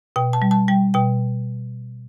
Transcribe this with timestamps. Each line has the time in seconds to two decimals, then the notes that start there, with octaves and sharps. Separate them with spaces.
0.16 B2 G5
0.33 A5
0.42 G3
0.51 A5
0.68 G3 G5
0.94 B2 G5